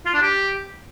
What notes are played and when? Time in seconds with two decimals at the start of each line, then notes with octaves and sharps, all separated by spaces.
0.06 F4
0.14 D4
0.22 G4